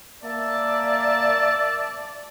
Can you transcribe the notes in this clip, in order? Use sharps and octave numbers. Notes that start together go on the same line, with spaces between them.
A#3 D5 E5 A5